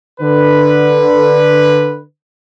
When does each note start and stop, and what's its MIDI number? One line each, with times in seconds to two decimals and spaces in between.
0.21 2.02 50
0.21 2.02 71